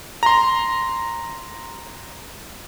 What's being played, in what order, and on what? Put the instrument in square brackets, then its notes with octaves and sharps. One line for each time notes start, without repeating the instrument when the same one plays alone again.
[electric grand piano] A#5 C6